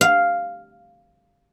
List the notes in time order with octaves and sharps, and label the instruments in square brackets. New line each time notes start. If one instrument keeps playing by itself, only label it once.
[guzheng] F5